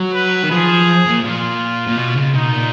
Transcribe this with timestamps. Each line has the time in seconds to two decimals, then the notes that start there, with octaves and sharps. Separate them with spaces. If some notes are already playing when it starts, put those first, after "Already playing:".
Already playing: F#3
0.13 B4
0.44 D#3
0.51 F3 G#4
1.06 A#2
1.24 A#2 F4
1.88 A#2
1.98 B2
2.16 C#3
2.35 B2 D#4
2.53 A#2